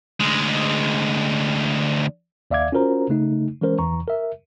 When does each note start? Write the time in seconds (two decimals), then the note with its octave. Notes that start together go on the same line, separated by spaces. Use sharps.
0.20 D2 G#3
2.51 D#2 D5 E5 F5 D6 G#6
2.72 C#4 F4 F#4 A#4 C5 A#5
3.09 C#3 A3 D#4
3.61 E3 G#3 C#4 A#4 C5
3.79 E2 E3 A#5 C#6
4.08 A#4 E5